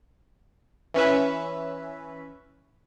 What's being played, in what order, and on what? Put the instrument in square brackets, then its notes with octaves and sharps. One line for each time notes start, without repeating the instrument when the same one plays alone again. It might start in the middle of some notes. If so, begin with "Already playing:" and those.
[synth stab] E3 C#4 B4 E5